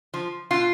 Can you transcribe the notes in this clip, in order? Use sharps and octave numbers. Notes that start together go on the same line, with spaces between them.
F3
B2 F4